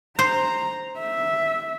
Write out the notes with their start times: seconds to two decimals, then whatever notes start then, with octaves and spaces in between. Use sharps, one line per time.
0.19 C5 A#5
0.99 E5